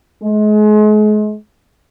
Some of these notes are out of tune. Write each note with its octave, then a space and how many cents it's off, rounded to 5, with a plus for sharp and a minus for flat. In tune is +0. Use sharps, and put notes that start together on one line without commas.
G#3 +35